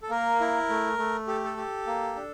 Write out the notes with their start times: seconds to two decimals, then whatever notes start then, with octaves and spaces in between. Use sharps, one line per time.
0.02 A4
0.10 A#3 A#4
0.40 E4
0.70 A3
0.98 A3
1.27 G4 A4
1.45 A4
1.57 G4
1.87 A#3
2.16 D4